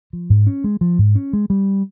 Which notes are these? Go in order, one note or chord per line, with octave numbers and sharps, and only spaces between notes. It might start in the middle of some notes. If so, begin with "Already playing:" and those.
F3
G#2
C#4
G#3
F3
G#2
C#4
G#3
G3